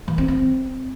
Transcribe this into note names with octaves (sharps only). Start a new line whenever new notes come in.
E3
C4
C4